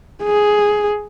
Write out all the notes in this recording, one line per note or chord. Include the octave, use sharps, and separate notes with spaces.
G#4